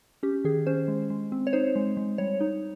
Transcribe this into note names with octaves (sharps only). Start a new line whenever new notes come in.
C#4 G4
D#3 G#4
C#4 C5
G#3
G#3
C4
C#5
D#4 C5
G#3
G#3
G3 C#5
D#4